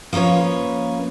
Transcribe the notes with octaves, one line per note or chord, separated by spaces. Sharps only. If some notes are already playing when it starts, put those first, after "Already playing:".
F3 A#3 C#4 B4 C#5